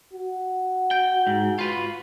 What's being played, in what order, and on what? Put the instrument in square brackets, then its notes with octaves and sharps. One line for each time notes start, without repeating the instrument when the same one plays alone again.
[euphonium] F#4
[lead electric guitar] G5
G#2
F4 B4